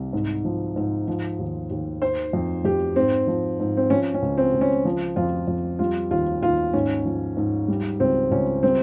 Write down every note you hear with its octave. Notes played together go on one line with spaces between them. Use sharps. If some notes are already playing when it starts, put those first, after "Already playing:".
Already playing: C2
G#2
F3
G#2
F3
D#2
D#2
D#3 C5
F2
F2 G4
G#2 C4
F3
G#2
C4
F3 C#4
C#4
C#2
C4
C#2
C#4
F3
F2 F4
F2
G3 F4
D#2 F4
D#2 F4
G#2 C#4
F3
G#2
G3
C#2 C4
C#2 C#4
G3 C4